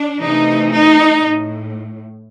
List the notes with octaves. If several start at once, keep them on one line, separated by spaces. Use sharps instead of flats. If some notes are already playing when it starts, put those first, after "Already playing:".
Already playing: D4
C3 E3 A3 D#4
D#4
A2